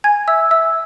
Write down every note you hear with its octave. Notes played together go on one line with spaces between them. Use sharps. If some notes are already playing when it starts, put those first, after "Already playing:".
G#5 G#6
E5 E6
E5 E6